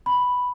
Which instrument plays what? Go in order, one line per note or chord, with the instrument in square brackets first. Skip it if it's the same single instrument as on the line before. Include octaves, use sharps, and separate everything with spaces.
[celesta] B5